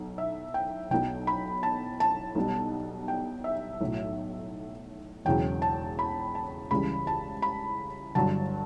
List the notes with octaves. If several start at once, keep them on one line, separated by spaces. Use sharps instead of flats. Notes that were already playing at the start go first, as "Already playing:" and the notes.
Already playing: B1
E5
G5
B1 B2 F#3 G5
B5
A5
A5
B1 B2 G3
G5
E5
B1 A2 F#3
E1 E2 C#3 F#3 G5
A5
B5
A5
C#2 C#3 E3 G3 B5
A5
B5
G1 G2 D3 F#3 A5